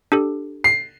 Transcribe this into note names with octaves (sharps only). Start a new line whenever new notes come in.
D4 G4 A4
C7